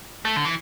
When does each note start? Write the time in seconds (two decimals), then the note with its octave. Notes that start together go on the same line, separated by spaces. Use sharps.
0.25 A3
0.36 D3
0.45 E3